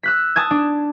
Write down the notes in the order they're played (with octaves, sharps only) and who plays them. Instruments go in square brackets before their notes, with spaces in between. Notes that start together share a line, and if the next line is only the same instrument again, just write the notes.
[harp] E6 F#6 B6
A5 D#6 G#6
D4